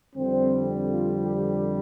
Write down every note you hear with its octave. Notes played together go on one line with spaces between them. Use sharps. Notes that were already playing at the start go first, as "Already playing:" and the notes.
F2 D3 G3 C4
F4
G4